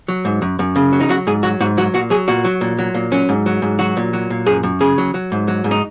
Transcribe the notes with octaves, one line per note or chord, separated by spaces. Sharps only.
F#3
G#2
F#2
F#2
C#3
F#3
D#4
F#3 F#4
G#2 G#4
F#3 F#4
G#2 F#4
F#3 F#4
A#2 F#4
F#3 G#4
A#2 F#4
F#3
A#2
F#3
A#2
F#3 C#4
G#2
F#3
G#2
F#3 F#4
A#2
F#3
A#2
F#2 G#4
F#2
C#3 G#4
F#3
F#3
G#2
F#3
G#2
D#4